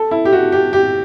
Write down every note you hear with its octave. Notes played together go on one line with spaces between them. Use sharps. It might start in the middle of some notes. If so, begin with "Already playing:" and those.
Already playing: A4
E4
G4
F#4
G4
G4